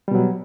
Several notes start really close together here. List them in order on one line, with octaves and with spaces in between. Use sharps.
G3 B2 F#3